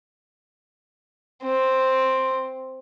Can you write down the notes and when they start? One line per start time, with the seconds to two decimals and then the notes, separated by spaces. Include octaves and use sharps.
1.43 C4